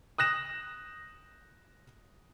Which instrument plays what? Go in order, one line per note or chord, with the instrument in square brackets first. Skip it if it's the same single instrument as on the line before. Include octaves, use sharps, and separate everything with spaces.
[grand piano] D#6 F#6 A#6 E7